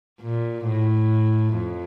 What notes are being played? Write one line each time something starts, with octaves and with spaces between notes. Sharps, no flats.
A#2
A2
F2